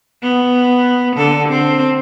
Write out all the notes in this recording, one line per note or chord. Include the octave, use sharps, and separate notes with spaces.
B3
D3 A4
C4